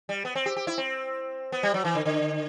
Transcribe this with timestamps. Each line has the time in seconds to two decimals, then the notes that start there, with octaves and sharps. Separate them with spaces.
0.09 G3
0.25 B3
0.35 C4
0.46 G4
0.57 G4
0.67 E4
0.78 C4
1.52 B3
1.63 G3
1.74 F#3
1.85 E3
1.95 D3
2.05 D3